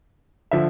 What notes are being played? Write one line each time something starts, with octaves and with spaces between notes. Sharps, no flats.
D3 F3 E5